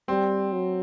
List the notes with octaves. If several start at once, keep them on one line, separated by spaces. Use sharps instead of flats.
G3 C4
F#3